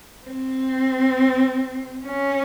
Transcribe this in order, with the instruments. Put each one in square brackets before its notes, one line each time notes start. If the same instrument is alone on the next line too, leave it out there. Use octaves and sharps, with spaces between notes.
[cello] C4
C#4